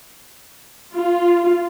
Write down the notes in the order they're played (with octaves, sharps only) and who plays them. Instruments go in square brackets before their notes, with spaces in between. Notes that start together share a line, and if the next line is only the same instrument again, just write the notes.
[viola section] F4